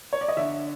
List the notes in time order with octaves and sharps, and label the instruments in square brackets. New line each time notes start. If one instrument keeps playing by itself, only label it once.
[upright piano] C#5
D5
D#5
D3 E5